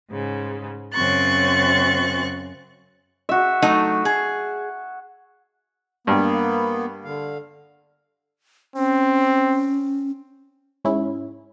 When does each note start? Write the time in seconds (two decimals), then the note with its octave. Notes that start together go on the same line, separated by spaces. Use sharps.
0.10 G#2 C#3
0.93 F#2 C#3 C4 C#6 F#6 A6
3.29 F#4 E5
3.62 F#3 A3 D#4
4.05 G#4
6.07 G2 A#3 B3
7.05 D3 F5
8.76 C4 C#4
10.85 G#2 C#4 E4